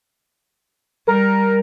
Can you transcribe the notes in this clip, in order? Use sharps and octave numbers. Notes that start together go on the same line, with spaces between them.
G3 A#4